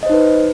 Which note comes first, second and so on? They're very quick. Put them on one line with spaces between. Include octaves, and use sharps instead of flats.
D#5 C5 D#4 B4